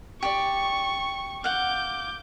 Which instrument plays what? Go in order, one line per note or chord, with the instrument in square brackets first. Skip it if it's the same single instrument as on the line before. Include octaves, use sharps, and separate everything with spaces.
[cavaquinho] G4 D5 [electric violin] C#6
[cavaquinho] F5 F#5 [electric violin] D6 G6